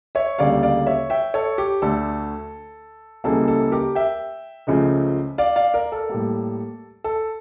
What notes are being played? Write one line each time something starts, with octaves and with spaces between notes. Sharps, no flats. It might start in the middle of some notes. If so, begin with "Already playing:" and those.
C#5 E5
D2 C#3 G3 A#3 D5 F5
D5 F5
C#5 E5
E5 G5
A4 C#5
G4
D2 D3 A3 A4
C#2 C#3 E3 G3 A#3 A4
A4
G4 A#4
E5 G5
C#2 C#3 F3 A3
D5 F5
D5 F5
A#4 D5
A4
A2 G3 A#3
A4